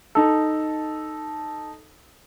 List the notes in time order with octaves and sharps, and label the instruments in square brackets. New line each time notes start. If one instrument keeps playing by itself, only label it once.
[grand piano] D#4 A4